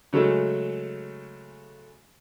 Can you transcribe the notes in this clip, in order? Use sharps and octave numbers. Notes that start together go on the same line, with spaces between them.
C#3 F#3 G#3 A3